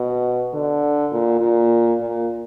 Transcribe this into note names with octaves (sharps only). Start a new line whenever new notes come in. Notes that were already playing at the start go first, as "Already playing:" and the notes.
Already playing: B2
D3
A#2
A#2
A#2